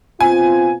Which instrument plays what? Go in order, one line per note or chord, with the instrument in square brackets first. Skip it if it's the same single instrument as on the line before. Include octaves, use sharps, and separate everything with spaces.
[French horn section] B2 C4 F4 [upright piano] G#5